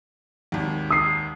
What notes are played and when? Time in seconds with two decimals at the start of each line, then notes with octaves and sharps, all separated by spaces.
0.52 G#1 D#2
0.90 D#6 C7